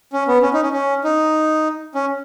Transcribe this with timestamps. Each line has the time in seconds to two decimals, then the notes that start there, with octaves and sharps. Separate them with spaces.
0.13 C#4
0.28 B3
0.42 C#4
0.53 D#4
0.63 C#4
0.73 C#4
1.04 D#4
1.95 C#4